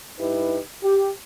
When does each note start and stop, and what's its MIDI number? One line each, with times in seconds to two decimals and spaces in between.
0.20 0.59 43
0.20 0.59 63
0.20 0.59 64
0.20 0.59 67
0.20 0.59 71
0.83 1.09 67